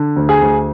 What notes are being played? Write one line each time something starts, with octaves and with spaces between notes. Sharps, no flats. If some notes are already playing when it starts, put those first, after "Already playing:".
Already playing: D3
D2
G#4
D2